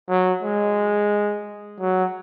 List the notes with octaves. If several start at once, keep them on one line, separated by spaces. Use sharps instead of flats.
F#3
G#3
F#3